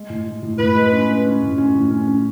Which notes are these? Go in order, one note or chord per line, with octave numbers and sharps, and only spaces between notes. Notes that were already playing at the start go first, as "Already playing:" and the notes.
Already playing: G#3
A2
A2
A2
A2 B4
G#3
C#4
C#4
C#4
A2
C#4
A2
C#4
C#4